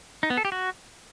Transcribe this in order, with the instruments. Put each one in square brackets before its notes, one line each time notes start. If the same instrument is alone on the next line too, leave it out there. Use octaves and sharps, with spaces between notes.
[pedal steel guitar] D#4
B3
A4
G4
F#4